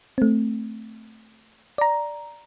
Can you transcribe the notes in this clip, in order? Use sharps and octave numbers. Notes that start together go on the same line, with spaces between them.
A3 C4
D5 A#5